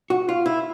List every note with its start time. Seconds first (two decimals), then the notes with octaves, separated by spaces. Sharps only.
0.10 F#4
0.29 F4
0.46 E4